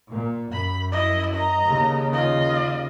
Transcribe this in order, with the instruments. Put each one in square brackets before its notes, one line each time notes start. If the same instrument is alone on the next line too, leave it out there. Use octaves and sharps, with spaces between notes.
[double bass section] A#2
[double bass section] F#2 [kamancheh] B5
[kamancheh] E4 D#5
D#5 A#5
[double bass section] D#2 C#3
[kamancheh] F4 D#5